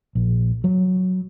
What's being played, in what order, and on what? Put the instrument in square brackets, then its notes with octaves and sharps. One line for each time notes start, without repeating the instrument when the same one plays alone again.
[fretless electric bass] A#1
F#3